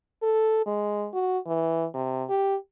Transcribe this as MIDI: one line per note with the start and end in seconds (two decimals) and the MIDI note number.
0.22 0.63 69
0.66 1.07 56
1.13 1.38 66
1.47 1.85 52
1.94 2.24 48
2.29 2.56 67